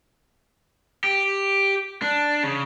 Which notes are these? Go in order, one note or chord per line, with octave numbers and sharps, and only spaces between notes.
G4
D4
C#3